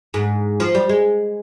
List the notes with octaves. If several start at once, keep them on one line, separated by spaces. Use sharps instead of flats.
G#2
F3
G3
G#3